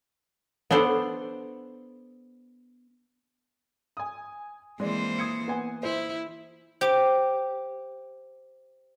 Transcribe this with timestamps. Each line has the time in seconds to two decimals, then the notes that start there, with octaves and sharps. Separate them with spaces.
0.71 B3 D4 A4 C5 D5
3.97 G#5 D#6
4.80 E3 G#3 A#3 C4 C5 D5
5.19 D#6 G#6 C#7
5.48 B3 G#5
5.83 E4 C5
6.81 G4 C5 D6 D7